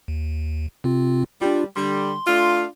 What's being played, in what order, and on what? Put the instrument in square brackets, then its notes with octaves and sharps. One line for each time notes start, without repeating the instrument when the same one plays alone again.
[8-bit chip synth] D#2
C3 C4 F4
[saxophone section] G3 [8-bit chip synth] D4 F4
[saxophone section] D3 G3 [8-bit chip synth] C6
[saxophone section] A3 D4 F4